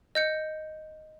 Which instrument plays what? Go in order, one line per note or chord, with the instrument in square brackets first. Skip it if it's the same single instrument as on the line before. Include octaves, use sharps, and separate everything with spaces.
[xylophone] D#5 G6 C#7